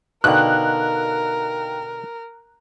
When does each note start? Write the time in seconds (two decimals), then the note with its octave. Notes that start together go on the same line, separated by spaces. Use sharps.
0.24 B2 D3 D#4 A#4 F5 G5 F#6